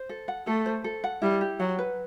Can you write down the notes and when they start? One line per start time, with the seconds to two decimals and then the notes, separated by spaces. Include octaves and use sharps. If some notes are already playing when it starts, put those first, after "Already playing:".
Already playing: C5
0.09 A4
0.28 F#5
0.47 A3 A4
0.66 C5
0.84 A4
1.04 F#5
1.22 G3 E4
1.41 G4
1.60 F#3 F#5
1.79 B4